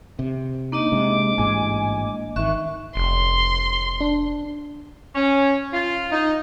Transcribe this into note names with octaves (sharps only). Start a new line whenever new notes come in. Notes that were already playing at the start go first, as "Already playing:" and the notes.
C3
A#3 D4 D#4 D#5 D6
C3 G#3
A1 G#2 G#3 G#5
G#1 D#3 E5 C#6 F#6
F1 C6
D4
C#4
F4
D#4